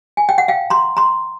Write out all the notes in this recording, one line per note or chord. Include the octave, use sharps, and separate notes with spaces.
G#5
G5
F#5
F5 G5
A#5 C6
A#5 C6